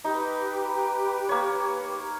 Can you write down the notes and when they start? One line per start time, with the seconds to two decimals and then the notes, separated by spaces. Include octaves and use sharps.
0.04 D#4 G4 B4
1.29 A#3 C#5